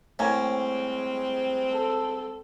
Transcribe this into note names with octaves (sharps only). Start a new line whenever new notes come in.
A2 G3 G#3 A#3 C4 C#4
A4